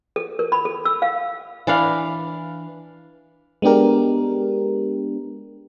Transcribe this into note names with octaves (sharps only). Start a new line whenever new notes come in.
A4
A#4
B5
A4
E6
F5
E3 D4 B4 F5
G#3 B3 D4 G4 A#4